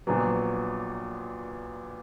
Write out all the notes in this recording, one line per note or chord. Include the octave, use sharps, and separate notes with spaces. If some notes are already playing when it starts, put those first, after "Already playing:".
A#1 A#2 F#3 B3